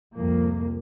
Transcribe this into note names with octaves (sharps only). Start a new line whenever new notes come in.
C2 F2 A2 F3 A#3